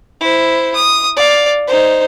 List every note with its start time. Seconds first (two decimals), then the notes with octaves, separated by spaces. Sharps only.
0.21 E4 C5
0.76 D#6
1.17 D5 F5
1.67 D#4 C5